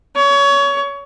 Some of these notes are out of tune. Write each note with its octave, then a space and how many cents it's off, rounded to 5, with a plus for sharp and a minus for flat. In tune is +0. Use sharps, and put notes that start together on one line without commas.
C#5 +25